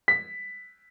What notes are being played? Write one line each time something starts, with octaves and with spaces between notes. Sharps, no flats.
B6